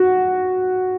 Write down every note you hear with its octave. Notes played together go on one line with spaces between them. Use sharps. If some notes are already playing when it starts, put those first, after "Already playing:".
Already playing: F#4